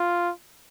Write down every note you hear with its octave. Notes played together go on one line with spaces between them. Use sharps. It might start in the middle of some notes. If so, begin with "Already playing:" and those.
Already playing: F4